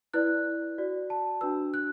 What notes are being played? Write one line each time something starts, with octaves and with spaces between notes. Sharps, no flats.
E4 B4 D5 F#6
F#4 D5
A5
D4 F#4 B4 E6
F#6